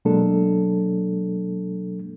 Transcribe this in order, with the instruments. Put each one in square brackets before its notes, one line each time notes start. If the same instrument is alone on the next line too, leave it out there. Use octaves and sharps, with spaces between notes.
[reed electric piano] B2 F#3 G#3 A#3 D4 A4